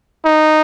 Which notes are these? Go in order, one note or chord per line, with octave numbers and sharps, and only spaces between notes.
D#4